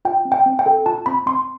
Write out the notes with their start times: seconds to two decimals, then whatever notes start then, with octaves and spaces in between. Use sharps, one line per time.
0.05 F4 G5
0.25 C4
0.32 G5
0.46 C4
0.59 G5
0.66 A4
0.86 F4 A5
1.06 C4 B5
1.26 C4 C6